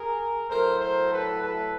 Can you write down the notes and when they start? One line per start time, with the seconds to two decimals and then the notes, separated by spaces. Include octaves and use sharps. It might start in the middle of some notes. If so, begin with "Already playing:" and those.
Already playing: G#4 A#4
0.50 A2 F#3 A3 A#4 C5
0.80 A#4 C5
1.11 A4 B4
1.41 A4 B4